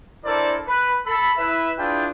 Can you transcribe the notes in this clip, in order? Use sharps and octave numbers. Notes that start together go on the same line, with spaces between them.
D4 E4 A4 A#4 C5 D5
B4
A4 B5
E4 B4 E5
D4 E4 F4 G#4 B4 G5